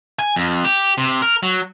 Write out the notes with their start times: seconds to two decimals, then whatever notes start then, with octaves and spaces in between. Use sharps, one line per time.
0.19 G#5
0.36 F2
0.64 G4
0.98 C3
1.22 A#4
1.43 F#3